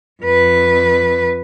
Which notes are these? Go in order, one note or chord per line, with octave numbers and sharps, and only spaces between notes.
F2 B4